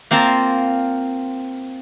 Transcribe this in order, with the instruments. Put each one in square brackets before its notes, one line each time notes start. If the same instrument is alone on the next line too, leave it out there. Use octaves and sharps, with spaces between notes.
[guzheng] A#3 C4 F4 A#4 A5